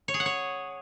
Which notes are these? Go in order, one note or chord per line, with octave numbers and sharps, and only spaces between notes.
C#5
G#4
F#5
C#5